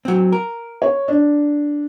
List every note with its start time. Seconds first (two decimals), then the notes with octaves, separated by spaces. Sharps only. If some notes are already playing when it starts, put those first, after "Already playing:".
0.05 F#3 C4
0.32 A#4
0.82 C#5
1.08 D4